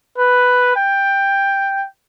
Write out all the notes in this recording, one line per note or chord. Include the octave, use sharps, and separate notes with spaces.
B4
G5